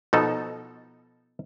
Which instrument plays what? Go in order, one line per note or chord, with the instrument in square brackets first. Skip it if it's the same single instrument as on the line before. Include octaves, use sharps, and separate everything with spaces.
[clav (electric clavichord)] B2 F3 D#4 A4